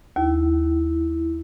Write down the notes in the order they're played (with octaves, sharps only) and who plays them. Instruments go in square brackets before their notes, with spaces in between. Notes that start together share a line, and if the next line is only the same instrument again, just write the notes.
[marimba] D#2 [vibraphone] E4